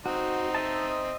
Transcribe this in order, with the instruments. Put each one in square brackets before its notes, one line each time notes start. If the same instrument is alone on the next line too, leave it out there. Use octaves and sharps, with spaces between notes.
[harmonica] C4 D#4 [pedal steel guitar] F#4
[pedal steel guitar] D#5 E5 A5